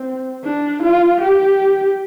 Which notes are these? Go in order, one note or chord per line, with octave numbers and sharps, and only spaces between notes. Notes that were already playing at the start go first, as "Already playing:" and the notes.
Already playing: C4
D4
F4
G4